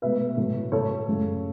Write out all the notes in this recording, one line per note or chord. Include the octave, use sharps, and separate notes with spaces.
B2 A3 B4 E5
A2 F#3 A3
A2 A3 A4 C#5
F#2 C#3 A3